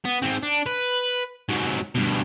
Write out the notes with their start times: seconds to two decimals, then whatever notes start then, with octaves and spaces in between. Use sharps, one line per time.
0.05 B3
0.22 G#2 C4
0.43 D4
0.66 B4
1.49 G#2 F#3
1.95 G2 B2